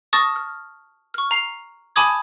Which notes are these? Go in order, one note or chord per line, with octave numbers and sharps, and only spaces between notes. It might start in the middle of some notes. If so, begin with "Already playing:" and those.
A5 C#6 D#6 F6 A6 A#6
F6
C#6 F6
A#5 C7 F7
G#5 A5 B5 D6 D#6 G#6